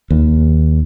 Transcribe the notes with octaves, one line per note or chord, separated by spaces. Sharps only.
D#2